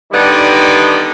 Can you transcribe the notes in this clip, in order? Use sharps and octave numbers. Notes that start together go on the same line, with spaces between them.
D3 D#3 G3 B3 D4 D#4